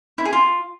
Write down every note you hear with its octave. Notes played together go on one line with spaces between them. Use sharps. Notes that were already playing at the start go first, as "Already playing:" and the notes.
E4
G#4
F4